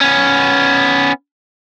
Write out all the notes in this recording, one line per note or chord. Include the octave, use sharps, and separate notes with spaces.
B3 C#4